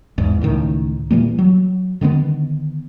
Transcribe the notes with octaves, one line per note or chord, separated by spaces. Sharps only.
E2 G#2
C#2 A2 D#3
A#2 E3 G3 A#3
F#3
D3 D#3 G3 B3